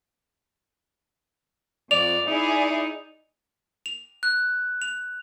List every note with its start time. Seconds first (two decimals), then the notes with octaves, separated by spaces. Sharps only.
1.91 F2 D5 F7
2.27 D#4 E4 G#4 D5
3.86 F7
4.23 F#6
4.82 F7